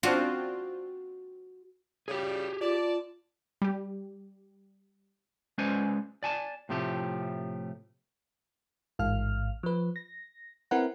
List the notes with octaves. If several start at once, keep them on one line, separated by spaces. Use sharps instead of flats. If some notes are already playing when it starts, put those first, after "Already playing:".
C4 D4 F4 F#4
C#3 G3 G4 G#4
F4 D5 A5
G3 G4
G#3 C#4 B4 C5 D5 G#5
D5 G#5 A5
A2 C3 F3 A3 G4
A1 G#2 F5 F6
F3 B4
A#6
C4 E4 A#4 B4 F#5